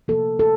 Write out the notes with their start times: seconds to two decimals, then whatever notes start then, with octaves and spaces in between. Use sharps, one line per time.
0.08 C3 F3 A#3 A4
0.39 A4